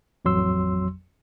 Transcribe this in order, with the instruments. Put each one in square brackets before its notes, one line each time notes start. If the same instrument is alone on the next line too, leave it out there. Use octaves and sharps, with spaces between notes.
[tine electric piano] A1 F2 F#3 C6 E6